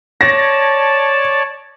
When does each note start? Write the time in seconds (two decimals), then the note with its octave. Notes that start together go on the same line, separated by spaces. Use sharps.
0.21 C#5 D5 A5 A#6